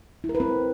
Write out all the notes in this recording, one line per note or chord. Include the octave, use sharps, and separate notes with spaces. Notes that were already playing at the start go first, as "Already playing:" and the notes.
E4
A#4
B4
C4